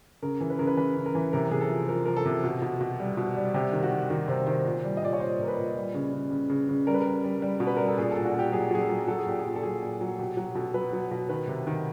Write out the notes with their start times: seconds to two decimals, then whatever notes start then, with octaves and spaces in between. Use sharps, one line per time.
0.22 C#3 A#4
0.41 E3
0.50 B4
0.59 C#3 A#4
0.67 B4
0.77 E3 B4
0.96 C#3
1.06 A#4
1.15 E3
1.33 C3 A#4
1.51 C3 G#4
1.61 A4
1.69 F3
1.88 F3 A#4
2.05 F3 A#4
2.16 A4
2.25 C3
2.44 B2
2.62 B2
2.81 B2
3.00 G3
3.17 B2
3.36 G3
3.54 C3 G4
3.73 D#3
3.83 F#4
3.92 D#3
4.10 D#3 F#4
4.28 C3 C5
4.47 D#3 C5
4.65 A#2
4.84 G3
4.97 D#5
5.02 A#2 D5
5.13 C#5
5.20 A#2 C5
5.39 A#2 A#4
5.48 B4
5.58 A#2
5.77 G3
5.94 C#3
6.12 C#3
6.31 C#3
6.50 C#3
6.69 C#3
6.87 G3 A#4
6.94 B4
7.01 G3 A#4
7.24 G3
7.42 G3
7.60 B2
7.67 B4
7.77 G3 A#4
7.87 A4
7.98 A#2 G#4
8.11 A#2 A4
8.25 F#4
8.34 A#2 G4
8.52 F#3 G#4
8.71 F#3 G#4
8.81 A4
8.90 F#3
9.08 F#3 A4
9.19 G#4
9.26 A#2 G4
9.39 G#4
9.45 A#2
9.56 A4
9.63 F#3 G#4
9.82 A#2
10.01 F#3
10.19 B2 G4
10.37 F#3
10.55 B2 A4
10.74 F#3 B4
10.93 F#3
11.11 B2
11.29 D#3 B4
11.48 C3
11.67 D#3